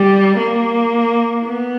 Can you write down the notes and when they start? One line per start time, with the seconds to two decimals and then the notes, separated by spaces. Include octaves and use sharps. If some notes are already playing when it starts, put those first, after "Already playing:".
Already playing: G3
0.37 A#3
1.45 B3